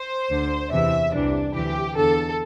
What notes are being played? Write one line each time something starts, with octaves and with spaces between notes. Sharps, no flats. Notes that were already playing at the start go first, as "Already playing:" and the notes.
Already playing: C5
D2 D3
E2 C3 E3 E5
C2 C3 E3 D4
D2 C3 E3 G4
E2 D3 A4